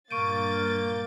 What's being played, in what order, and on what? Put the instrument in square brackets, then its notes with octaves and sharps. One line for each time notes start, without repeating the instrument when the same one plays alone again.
[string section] G2 A#2 A6 [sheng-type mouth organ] A#3 G6 [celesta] C#6 D7 D#7